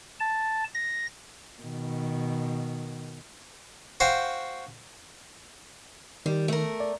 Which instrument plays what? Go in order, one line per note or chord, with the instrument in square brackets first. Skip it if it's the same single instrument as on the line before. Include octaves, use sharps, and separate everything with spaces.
[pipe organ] A5
A#6
[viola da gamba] B2 D#3
[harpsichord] F#4 C5 F5 G5
[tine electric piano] D#3 [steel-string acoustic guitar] G3
[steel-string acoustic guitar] A3 A#4
[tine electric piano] D5